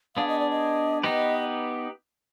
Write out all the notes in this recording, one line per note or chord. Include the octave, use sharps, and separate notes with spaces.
B3 D4 G#4 F5
D#5
D5
D#5
B3 D#4 G4 B4 D#5